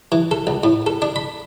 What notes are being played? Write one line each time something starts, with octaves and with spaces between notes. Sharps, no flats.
E3
A4
C#2
A2
A4
D4
B5